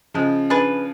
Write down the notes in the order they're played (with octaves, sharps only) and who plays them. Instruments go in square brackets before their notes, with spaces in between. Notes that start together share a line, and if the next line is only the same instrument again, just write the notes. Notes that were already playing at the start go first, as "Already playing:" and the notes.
[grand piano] C#3 F3 [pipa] G#3
[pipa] D4 G#4 B4